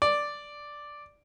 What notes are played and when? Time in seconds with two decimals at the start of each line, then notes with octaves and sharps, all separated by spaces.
0.02 D5